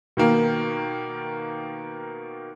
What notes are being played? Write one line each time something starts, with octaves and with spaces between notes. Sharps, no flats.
B2 D#3 A#3